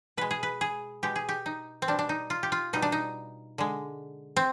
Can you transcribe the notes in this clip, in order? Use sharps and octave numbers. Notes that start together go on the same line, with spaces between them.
B2 G#3 B4
G#4
B4
G#4
B2 G#3 G4
G#4
G4
D#4
C4
B2 G3 D4
D4
D#4
F4
G4
F4
B2 G3 D#4
D4
D#4
D3 G#3
C4